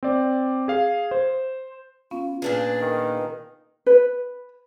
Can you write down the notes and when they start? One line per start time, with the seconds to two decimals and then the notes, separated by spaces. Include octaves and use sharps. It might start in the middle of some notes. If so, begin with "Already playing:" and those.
0.03 C4 D5
0.68 G#4 F5
1.11 C5
2.11 B3 C#4 F4 F5
2.42 A#2 D4 G#4 B4
2.81 D#3
3.86 B4